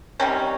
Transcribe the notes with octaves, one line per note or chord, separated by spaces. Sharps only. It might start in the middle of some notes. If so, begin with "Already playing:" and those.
C3 D#3 G3 C#4